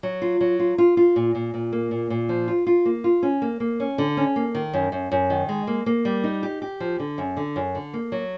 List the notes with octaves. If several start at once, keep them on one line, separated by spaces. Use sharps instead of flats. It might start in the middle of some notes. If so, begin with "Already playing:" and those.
F#3
F4
F#3
F4
F4
F4
A#2
A#2
A#2
A#3
A#2
A#2
F3
F4
F4
A#3
F4
C#4
A#3
A#3
C#4
D3
C#4
A#3
D#3
F#2
F#2
F#2
D#3
G#3
A#3
A#3
G3
D#4
G4
G4
F3
D3
F#2
D3
F#2
D3
A#3
F#3